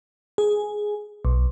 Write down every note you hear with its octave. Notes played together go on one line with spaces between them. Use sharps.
G#4
B1